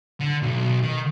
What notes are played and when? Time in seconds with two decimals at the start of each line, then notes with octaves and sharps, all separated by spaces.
0.20 D3
0.43 B1
0.83 D#3